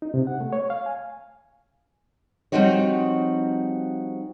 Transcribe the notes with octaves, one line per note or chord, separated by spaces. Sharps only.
D#4
C3
F#5
A3
C#5
F5
G#5
F3 G3 C4 D#4 F#4 C#5